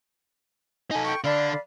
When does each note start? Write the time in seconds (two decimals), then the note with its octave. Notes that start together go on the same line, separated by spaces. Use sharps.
0.91 D#4 A4 G#5
1.04 G5 C#6
1.24 D3 D4 D5 F5 B5